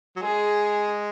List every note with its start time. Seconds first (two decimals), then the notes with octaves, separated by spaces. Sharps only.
0.17 F#3
0.22 G#3 G#4